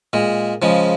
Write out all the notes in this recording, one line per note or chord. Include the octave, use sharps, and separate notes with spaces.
A#2 G#3
C#3 F3 G#3